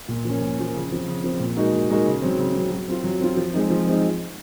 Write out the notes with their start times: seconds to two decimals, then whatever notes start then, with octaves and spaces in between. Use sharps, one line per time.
0.08 A#2
0.25 F3 A#3 C#4
0.41 A#2
0.58 F3 A#3 C#4
0.75 C#3
0.91 F3 C4
1.07 C#3
1.24 F3 C4
1.40 A#2
1.57 G#3 D#4 F#4 A#4
1.73 A#2
1.90 G#3 D#4 F#4 A#4
2.06 C#3
2.22 F#3 C4
2.39 C#3
2.55 F#3 C4
2.71 F#3
2.88 C4 F4
3.04 F#3
3.21 C4 F4
3.37 F3
3.53 G#3 C4 D#4
3.70 F3
3.86 G#3 C4 D#4